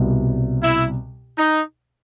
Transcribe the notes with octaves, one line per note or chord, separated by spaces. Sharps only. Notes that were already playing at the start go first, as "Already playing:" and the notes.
Already playing: C2 B2 G3
E4
D#4